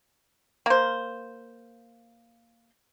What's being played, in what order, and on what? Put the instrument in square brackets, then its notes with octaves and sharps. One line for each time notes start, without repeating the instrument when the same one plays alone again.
[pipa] A#3 C5